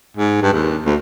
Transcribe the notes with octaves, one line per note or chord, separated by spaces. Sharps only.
G#2
G2
D#2
D2